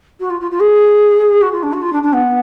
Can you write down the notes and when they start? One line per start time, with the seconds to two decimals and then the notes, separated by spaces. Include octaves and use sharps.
0.20 F#4
0.30 F4
0.40 F4
0.51 F4
0.61 G#4
1.41 F#4
1.52 F4
1.63 D4
1.73 F#4
1.82 F4
1.93 D4
2.03 D4
2.13 B3